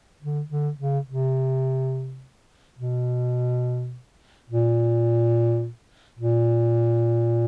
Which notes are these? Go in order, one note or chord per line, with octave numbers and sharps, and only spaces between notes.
D3
D3
C#3
C3
B2
A#2
A#2